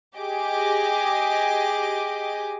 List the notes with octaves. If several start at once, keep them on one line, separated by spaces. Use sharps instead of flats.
G4 G#4 D#5 D6